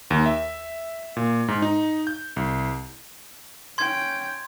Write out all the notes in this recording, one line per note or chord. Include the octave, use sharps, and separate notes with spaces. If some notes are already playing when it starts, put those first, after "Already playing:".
D#2
E5
A#2
G#2
D#4
G6
C2
C#4 G5 C6 G#6